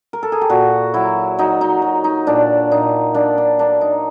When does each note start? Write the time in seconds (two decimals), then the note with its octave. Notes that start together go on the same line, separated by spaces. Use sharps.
0.13 A#4
0.23 A4
0.32 G#4
0.41 G4
0.49 A#2 F#4
0.94 F#3 E4
1.38 F#3 D#4
1.61 D#4
1.82 F#3
2.04 D#4
2.27 A#2 D4
2.71 A#2 D#4
3.14 A#3 D4
3.38 D4
3.59 A#3 D4
3.81 D#4